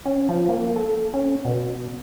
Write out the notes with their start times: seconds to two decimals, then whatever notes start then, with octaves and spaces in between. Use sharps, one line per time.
0.05 C#4
0.29 F3
0.49 A#3
0.76 A4
1.14 C#4
1.45 B2